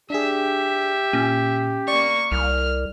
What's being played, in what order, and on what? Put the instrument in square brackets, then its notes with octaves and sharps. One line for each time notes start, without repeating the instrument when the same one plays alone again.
[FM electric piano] D4 G#4 [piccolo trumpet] G4 [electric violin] E5
[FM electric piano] A#2 [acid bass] C#4
[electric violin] A#3 C#6 [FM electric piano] D5
[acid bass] C2 [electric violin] F6